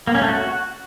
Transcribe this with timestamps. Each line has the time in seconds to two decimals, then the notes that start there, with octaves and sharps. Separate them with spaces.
0.07 A#3
0.15 C#4
0.22 A3
0.29 F#4